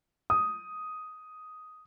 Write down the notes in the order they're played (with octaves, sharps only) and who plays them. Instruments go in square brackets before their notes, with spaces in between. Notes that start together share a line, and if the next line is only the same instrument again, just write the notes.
[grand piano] D#6